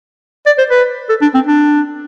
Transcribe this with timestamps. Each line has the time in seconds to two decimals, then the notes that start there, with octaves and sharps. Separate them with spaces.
0.46 D5
0.58 C5
0.70 B4
1.09 A4
1.22 D4
1.34 C4
1.47 D4